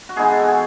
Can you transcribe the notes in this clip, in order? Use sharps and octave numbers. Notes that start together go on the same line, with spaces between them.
F#4
E3 G#3 B3 D#4 G#4
A4
F#4
G#4